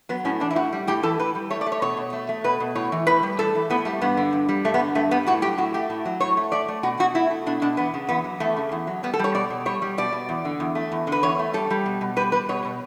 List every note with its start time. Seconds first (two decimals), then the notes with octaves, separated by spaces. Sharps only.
0.09 F#3 B3
0.25 A2 C#4
0.40 E3 D4
0.50 E4
0.56 A2 F#4
0.73 G3
0.87 A2 G4
1.03 E3 A4
1.19 A2 B4
1.35 G3
1.51 A3 C#5
1.61 D5
1.66 A3
1.72 C#5
1.82 B2 C#5
1.97 B2
2.13 A3
2.29 A3
2.44 B2 B4
2.60 B2
2.75 A2 C#5
2.92 E3
3.07 A2 B4
3.23 G3
3.39 A2 A4
3.55 E3
3.70 A2 B3
3.85 G3 A3
4.01 G2 B3
4.17 D3
4.33 G2
4.49 G3
4.65 G2 A3
4.74 B3
4.80 D3
4.95 G2 A3
5.11 G3 B3
5.27 A2 F#4
5.42 F#3 G4
5.58 A2 F#4
5.74 A3 G4
5.90 A2
6.05 F#3
6.20 A2 C#5
6.37 A3
6.52 A3 D5
6.68 A3
6.83 B2 F#4
6.99 B2 F#4
7.15 A3 E4
7.30 A3
7.46 B2 D4
7.62 B2 D4
7.77 E2 B3
7.94 C#3
8.09 E2 B3
8.24 F#3
8.40 E2 A3
8.57 C#3
8.72 E2
8.87 F#3
9.03 G3 B3
9.14 A4
9.19 G3 C#5
9.35 B2 D5
9.50 B2
9.66 G3 C#5
9.82 G3
9.98 B2 D5
10.12 B2
10.29 E2
10.45 D3
10.60 E2
10.75 A3
10.92 E2
11.07 D3
11.12 B4
11.23 E2 C#5
11.39 A3
11.54 G3 A4
11.70 G3
11.86 B2
12.01 B2
12.16 G3 B4
12.32 G3 B4
12.49 B2 C#5
12.65 B2